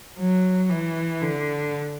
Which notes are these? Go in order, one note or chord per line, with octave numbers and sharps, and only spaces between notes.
F#3
E3
D3